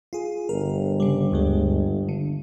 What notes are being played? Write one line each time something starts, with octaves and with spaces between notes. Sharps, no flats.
F4 G#4
G1 A#4
C#3 G3
D2 G2 G#3
D3